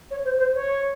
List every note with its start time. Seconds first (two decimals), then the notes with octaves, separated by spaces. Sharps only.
0.10 C#5
0.25 C5
0.39 C5
0.54 C#5